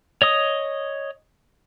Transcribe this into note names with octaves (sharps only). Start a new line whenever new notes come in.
C#5 D#5 D#6